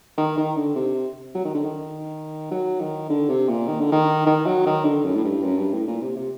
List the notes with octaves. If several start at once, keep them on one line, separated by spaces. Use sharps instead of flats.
D#3
D#3
D3
C3
F#3
D#3
D3
D#3
F#3
D#3
D3
C3
A#2
D#3
D3
D#3
D#3
F#3
D#3
D3
F#2
A2
G2
F#2
G2
A2
A#2
C3
C3